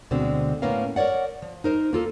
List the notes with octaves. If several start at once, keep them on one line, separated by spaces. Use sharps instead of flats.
D2 B2 D3 G#3 C4
A2 A#3 B3 C#4 A#4 F5
A#4 B4 C#5 D5 F#5
F3
D#4 A#4 C5
A#3 F4 A4